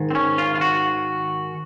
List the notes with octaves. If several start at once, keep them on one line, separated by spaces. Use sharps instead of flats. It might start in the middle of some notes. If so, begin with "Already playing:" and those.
Already playing: G#2 D#3
C4
C#4
F4
F4
F#4